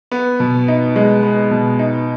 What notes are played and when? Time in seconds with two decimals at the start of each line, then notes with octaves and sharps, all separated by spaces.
0.11 B3
0.40 B2
0.68 D#4
0.96 G#3
1.23 B3
1.51 B2
1.79 D#4